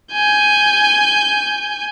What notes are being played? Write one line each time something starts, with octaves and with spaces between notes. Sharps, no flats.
G#5 G6